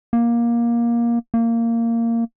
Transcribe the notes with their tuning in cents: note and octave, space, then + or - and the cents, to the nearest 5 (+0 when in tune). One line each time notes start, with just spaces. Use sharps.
A#3 +15
A#3 -15